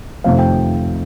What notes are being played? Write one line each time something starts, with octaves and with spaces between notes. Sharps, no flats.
F2 C3 D#3 A3 F5
G5